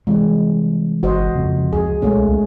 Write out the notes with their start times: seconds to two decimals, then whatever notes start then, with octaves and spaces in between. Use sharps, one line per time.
0.07 C3 E3 G3 G#3
1.03 G1 F#4 C5 D#5
1.36 F2 C#3
1.73 C#2 G#4
2.02 B1 G#3 A3 C#4